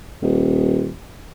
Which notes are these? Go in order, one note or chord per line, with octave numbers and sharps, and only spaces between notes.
D#1